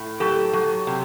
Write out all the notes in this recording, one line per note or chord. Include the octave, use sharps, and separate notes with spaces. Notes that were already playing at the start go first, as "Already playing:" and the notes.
Already playing: A2
F#3 G4 A4
F#3
C3